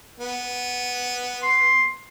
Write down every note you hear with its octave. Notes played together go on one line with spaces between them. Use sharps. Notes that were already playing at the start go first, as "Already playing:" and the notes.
B3
C6